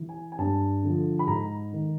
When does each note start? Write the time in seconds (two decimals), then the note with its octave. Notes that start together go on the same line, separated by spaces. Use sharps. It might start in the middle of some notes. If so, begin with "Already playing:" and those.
Already playing: E3
0.09 G#5
0.32 G#5
0.38 G2 A5
0.83 D3 F3
1.19 B5
1.27 G#2 A#5
1.73 D#3